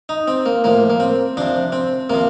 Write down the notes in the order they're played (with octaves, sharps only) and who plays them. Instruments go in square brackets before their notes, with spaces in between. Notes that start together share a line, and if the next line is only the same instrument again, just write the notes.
[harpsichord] D#4
C4
A#3
A2 F3 A#3
A#3
C4
C3 F3 D4
C4
C3 F3 A#3